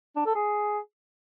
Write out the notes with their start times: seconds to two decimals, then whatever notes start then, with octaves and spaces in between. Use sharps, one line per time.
0.16 D4
0.26 A4
0.35 G#4